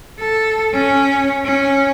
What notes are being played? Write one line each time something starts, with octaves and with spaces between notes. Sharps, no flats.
A4
C#4
C#4